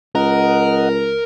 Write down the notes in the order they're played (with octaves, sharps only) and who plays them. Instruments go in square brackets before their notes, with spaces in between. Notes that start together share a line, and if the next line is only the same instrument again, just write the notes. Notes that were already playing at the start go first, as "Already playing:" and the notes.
[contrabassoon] C#2 [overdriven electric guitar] A#4 [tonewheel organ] D#5 F#5